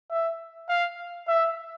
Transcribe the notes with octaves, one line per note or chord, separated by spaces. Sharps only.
E5
F5
E5